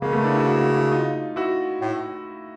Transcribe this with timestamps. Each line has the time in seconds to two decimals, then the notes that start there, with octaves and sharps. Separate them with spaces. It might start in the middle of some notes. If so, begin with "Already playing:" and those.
0.01 C#3 G#3 A#3
0.13 A3 B3
0.24 D4 E4
0.35 E4 F#4
0.47 E4 F#4
0.61 E4 F#4
0.76 E4 F#4
0.92 D#4 F4
1.36 E4 F#4
1.81 A2